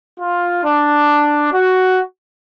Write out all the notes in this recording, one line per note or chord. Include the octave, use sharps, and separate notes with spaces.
F4
D4
F#4